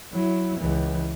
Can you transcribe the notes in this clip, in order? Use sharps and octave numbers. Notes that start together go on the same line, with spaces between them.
F#3 E4
C#2 E3